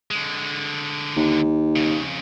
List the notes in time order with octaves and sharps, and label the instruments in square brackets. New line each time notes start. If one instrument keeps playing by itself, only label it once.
[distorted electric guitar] D3 G#3
[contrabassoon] D#2
[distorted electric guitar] F2 C#3